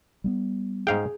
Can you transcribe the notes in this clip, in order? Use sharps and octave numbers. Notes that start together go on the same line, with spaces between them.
G3 A#3 B3
G#2 G#4 F5 G5